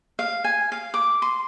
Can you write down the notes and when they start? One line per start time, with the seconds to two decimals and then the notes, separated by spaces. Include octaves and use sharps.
0.19 F5
0.44 G#5
0.72 F5
0.94 D6
1.22 C6